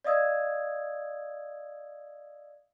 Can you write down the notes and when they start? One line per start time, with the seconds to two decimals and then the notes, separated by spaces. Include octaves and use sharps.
0.04 D5 D#5 F5 D#6 E6 G#6